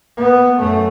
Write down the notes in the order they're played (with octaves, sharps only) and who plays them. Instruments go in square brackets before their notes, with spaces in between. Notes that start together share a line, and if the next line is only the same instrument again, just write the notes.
[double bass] B3
F#2 A3